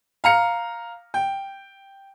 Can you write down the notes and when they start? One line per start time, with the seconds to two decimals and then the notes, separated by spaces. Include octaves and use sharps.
0.24 F5 A#5 C#7
1.14 G5